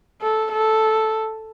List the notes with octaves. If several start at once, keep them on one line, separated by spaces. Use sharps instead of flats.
A4
A4